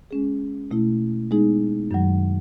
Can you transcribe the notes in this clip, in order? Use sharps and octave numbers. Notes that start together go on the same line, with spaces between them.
G#3 C#4 G#4
B2 A3 E4
G#3 B3 D#4 G#4
F#2 D#3 F#3